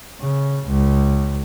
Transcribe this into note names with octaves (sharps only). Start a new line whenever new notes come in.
C#3
C#2